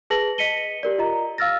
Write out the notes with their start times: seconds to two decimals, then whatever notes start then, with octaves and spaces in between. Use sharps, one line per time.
0.10 G#4 B4 A5 A#6 F#7
0.38 D#5 B6 C#7 D#7 G7
0.83 G4 A#4 D5
0.98 F4 D#5 A#5
1.38 F5 E6 F6 A6 A#6